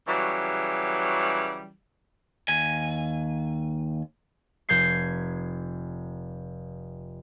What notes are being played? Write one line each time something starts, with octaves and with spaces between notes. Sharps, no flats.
C#3 E3 F#3 G3
D#2 G#5
F1 G6 G#6 C7